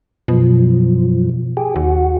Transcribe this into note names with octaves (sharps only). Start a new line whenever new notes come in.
F#2 B2 F3
G4 G#4
D#2 F#4